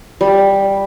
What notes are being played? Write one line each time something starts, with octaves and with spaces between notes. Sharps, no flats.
G3